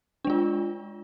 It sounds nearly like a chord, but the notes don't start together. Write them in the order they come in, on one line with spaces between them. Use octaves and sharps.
D4 G#3 F4